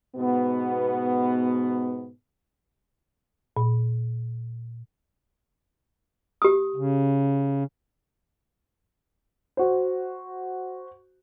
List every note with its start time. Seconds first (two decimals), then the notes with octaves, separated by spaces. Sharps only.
0.16 G#2 B2 B3
3.57 A#2
6.42 G4 D#6
6.76 C#3
9.57 F#4 C5